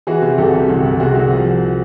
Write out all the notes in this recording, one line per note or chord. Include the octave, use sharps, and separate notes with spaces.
E3 F#4 G#4
C3
C2 G4 A4
C3
C2
C2
C3 F#4 G#4
C2
F3